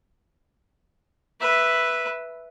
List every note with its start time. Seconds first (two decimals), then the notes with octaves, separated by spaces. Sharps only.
1.41 B4 E5